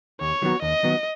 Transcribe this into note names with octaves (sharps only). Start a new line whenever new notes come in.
D#2 C#5
D#3 F#3 B3 F#4
D#2 D#5
D#3 F#3 B3 F#4